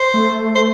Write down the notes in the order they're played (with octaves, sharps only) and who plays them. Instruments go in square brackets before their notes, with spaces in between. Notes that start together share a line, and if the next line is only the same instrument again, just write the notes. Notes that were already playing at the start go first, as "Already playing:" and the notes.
Already playing: [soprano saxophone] C5
[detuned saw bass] A3
[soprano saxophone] C5